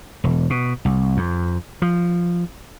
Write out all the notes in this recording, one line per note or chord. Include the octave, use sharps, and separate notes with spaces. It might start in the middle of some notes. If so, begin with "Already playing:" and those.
E1
B2
C2
F2
F3